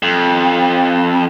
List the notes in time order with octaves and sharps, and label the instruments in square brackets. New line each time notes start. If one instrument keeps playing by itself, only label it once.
[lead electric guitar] F2